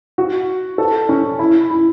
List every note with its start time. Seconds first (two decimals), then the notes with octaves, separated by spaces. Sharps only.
0.18 F#4
0.78 A4
1.09 C#4
1.39 E4
1.70 E4